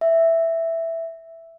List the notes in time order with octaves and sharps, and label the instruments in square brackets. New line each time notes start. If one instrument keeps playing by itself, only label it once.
[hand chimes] E5